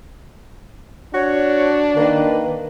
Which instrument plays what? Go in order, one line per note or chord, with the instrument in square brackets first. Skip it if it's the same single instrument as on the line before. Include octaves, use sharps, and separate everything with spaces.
[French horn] D4 [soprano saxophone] F#4 [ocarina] C#5
[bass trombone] D#3 [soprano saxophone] A#3 [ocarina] B4